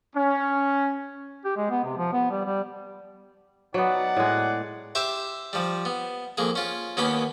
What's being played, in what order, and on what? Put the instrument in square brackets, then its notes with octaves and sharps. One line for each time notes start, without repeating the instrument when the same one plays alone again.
[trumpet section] C#4
[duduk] G4
G#3
B3
C3
F3
B3
G3
G3
[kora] F#3 B3 [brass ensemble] D#4 D5 F#5
[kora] A2 G#3
[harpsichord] G4 C5 E5
F3 G3
B3
F2 A#3 G#4
C#4 F4
D#2 A#3 B3 C#4 B4 B5